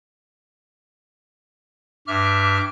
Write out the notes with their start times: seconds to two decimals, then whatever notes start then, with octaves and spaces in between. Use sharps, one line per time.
2.07 G2 E5 D6 F6